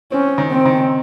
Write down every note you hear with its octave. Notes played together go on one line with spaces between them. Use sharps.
C4 C#4
D#3
C4
D#3